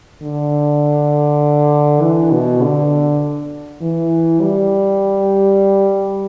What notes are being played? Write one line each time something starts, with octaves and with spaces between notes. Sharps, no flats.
D3
E3
B2
D3
E3
G3